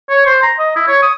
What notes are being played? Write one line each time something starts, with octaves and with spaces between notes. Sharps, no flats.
C#5
C5
A#5
D#5
E4
C#5
D#6